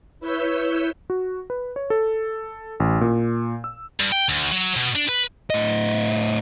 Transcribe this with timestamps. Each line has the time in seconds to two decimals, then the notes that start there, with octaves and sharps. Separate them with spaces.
0.20 E4 B4 C#5 E6 G6 B6
1.10 F#4
1.50 B4
1.76 C#5
1.90 A4
2.80 A1
3.01 A#2
3.64 E6
4.00 G2
4.12 G5
4.29 D2
4.52 F#3
4.76 B2
4.96 D4
5.09 B4
5.50 A2 D#5